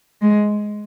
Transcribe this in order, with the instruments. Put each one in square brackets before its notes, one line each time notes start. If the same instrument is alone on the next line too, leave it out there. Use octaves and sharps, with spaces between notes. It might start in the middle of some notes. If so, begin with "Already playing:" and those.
[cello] G#3